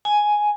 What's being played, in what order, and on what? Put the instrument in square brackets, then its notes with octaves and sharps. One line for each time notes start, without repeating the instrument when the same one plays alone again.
[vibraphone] G#5